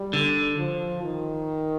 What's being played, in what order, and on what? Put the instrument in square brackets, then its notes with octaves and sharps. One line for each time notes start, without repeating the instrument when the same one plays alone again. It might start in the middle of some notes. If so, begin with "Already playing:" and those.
Already playing: [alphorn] G3
[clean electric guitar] D3
[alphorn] F3
D#3